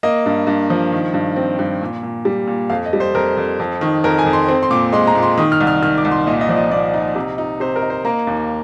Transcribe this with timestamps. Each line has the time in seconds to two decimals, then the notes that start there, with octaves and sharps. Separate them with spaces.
0.03 A#3 D#5
0.26 G2
0.47 G2
0.70 F3
0.92 D#3
1.14 G2
1.36 C4
1.59 G2
1.82 A#2
2.03 A#2
2.25 G3
2.47 A#2
2.70 F2 F5
2.86 D#5
2.93 G3
3.00 C5
3.15 F2 A#4
3.37 F2
3.59 F2
3.81 D#3
4.04 F2 A#4
4.18 G#5
4.26 F2
4.33 C6
4.48 C4 C6
4.63 C6
4.71 A#2 D6
4.92 G#3 C6
5.07 A#5
5.15 A#2
5.23 C6
5.38 D#3 D#6
5.52 F6
5.60 C2
5.67 F6
5.82 D#3 F6
5.98 D6
6.05 C2
6.11 C6
6.27 A#2 D#5
6.41 D#5
6.49 F3 D5
6.56 D#5
6.71 A#2 D5
6.94 D#4
7.15 C3
7.38 D#4
7.60 C3 C5
7.76 A#4
7.82 D#4
7.90 C5
8.05 A#3 A#5
8.27 D#2